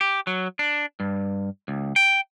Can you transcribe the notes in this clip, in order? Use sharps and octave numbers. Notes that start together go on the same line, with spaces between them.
G4
F#3
D4
G2
C#2
G5